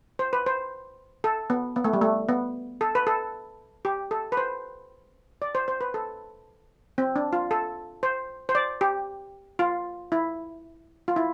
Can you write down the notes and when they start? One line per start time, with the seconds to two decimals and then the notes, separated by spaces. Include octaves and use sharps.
0.19 C5
0.33 B4
0.46 C5
1.24 A4
1.50 B3
1.76 B3
1.84 A3
1.93 G3
2.01 A3
2.29 B3
2.81 A4
2.95 B4
3.07 A4
3.85 G4
4.11 A4
4.32 B4
4.37 C5
5.42 D5
5.55 C5
5.68 C5
5.81 B4
5.94 A4
6.98 C4
7.16 D4
7.33 F4
7.51 A4
8.03 C5
8.49 C5
8.55 D5
8.81 G4
9.59 F4
10.12 E4
11.08 F4
11.16 E4